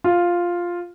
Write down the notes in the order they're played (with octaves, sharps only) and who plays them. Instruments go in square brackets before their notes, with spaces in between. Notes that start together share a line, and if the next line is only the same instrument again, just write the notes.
[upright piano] F4